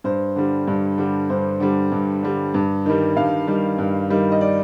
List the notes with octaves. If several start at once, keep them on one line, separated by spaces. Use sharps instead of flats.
G2 C5
D3 G3
G2
D3 G3
G2 C5
D3 G3
G2
D3 G3
G2
D#3 G3
G2 F5
D#3 G3
G2
D#3 G3
D#5
D5